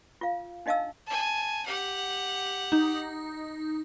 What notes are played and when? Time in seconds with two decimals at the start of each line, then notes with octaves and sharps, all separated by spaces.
0.21 F4 F5
0.66 D4 D#4 D#5 F5 A5 E6
1.07 G#5 A5
1.66 G4 F#5
2.72 D#4